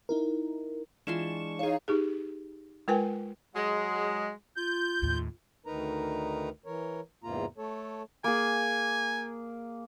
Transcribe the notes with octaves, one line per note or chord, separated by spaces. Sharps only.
D#4 E4 A#4
E3 G#3 D4 F4 C6 C#6 E7
D#4 G#4 C#5 F5
D#4 G4 G#4
G#3 F4 A#4 B4 G5 G#5
F#3 G#3
F4 G6
D#2 A2
D2 D#3 D#4 A#4 B4 A#5
E3 A#4 C#5
E2 G#2 C3 A#3 F4 A#5
A3 A4 C#5
A#3 G#4 G#5